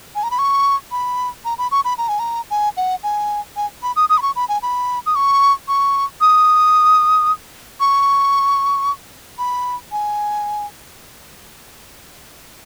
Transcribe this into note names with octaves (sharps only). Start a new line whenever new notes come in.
G#5
A#5
B5
C#6
B5
A#5
B5
C#6
B5
A#5
G#5
A#5
G#5
F#5
G#5
G#5
B5
D#6
D#6
B5
C#6
B5
G#5
B5
D#6
C#6
C#6
D#6
C#6
B5
G#5